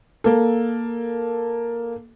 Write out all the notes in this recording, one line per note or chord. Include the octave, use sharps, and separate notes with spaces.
A#3 A4